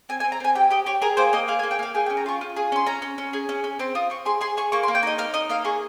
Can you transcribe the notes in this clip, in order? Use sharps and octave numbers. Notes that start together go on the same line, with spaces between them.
C4 G#5
G#5
C4
A#5
C4 G#5
G4 G5
G4 D#5
G4 C#5
G#4 A#4
A#3 C5
A#3 D#5
G#4 F5
G#5
A#3
G5
A#3 F5
G#4 G5
G5
C#4
A#5
F4 C#6
F4
G#4
C#4 C6
C#4 A#5
C#4
C#4
G#4
C#4
C#4
C4 C6
F4 D#6
C4 C#6
G#4 C6
G#4 C6
G#4 C#6
A#3 C#6
C6
A#3
G5
D#4 D#5
D#4 F5
D#4 D#5
A#3 F5
G#4 C#6